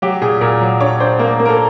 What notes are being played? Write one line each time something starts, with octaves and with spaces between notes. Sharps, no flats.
F#3 G4
A#2 G#4
A#2 A#4
F#3
D4 C#5
D4 C5
A#3 A#4
A#3
A#4
A4